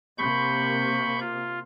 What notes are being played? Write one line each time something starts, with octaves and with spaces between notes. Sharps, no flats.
C3 A#3 B5 C#6 G6
F4